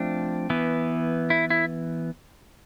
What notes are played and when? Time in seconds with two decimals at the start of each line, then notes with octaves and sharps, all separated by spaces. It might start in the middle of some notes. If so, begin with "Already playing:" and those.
Already playing: F3 A3 C4 D4
0.50 E3 B3
1.30 E4
1.50 E4